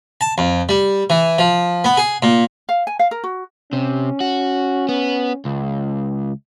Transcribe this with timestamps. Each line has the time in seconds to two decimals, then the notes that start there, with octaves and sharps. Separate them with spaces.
0.21 A5
0.38 F2
0.69 G3
1.10 E3
1.39 F3
1.84 B3
1.97 G#4
2.23 A#2
2.69 F5
2.87 G#5
2.99 F5
3.11 A#4
3.24 F#4
3.73 C3 C#4
4.21 F#4
4.89 B3
5.45 C#2